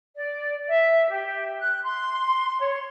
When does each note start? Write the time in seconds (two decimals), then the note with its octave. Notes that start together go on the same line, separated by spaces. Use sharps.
0.17 D5
0.69 E5
1.10 G4
1.60 F#6
1.84 C6
2.60 C#5